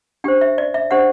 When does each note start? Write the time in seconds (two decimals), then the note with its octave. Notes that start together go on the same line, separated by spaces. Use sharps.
0.24 D4 G4 C5 G5
0.41 E5
0.58 D5
0.74 E5
0.91 D4 G4 C5 F#5